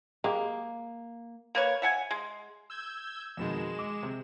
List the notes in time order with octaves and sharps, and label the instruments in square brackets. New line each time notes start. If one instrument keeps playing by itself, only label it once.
[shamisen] G#3 G4 [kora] A#3
[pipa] A#3 B4 C#5
E5 F#5 G#5
G#3
[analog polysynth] E6 G6 G#6
[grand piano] F2 B2 D#3 [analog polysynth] G#3 E7
[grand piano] D6
C3